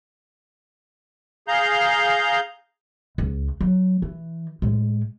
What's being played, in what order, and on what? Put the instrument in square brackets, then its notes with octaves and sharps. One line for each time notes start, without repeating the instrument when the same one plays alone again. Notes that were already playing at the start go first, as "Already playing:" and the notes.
[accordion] G#4 F5 A#5 G6
[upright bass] C#2
F#3
E3
A2 G#3